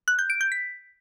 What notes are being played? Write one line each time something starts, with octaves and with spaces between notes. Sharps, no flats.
F#6
G6
D7
G6
B6